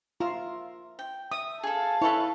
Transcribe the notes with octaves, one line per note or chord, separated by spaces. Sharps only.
F4 A#4 E5
G5
E5 D#6
G#4 A4 F5 A5
E4 A4 B4 C#5 E5